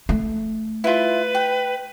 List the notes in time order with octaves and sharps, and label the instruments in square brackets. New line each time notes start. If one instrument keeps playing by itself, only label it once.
[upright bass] A3
[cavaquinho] E4 F4 [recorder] B4
[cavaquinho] G5